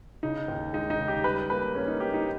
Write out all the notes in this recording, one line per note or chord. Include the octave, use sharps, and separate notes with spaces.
C#3 D#4
D#2
G#3 D#4
D#4
C#3
G4
G3 B4
A#3 B4
A#3 C#4
D#4
A#3 G4
D#4